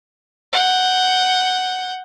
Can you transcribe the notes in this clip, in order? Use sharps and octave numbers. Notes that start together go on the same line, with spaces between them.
F#5 G6